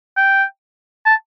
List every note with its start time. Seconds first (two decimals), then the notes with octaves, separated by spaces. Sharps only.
0.17 G5
1.05 A5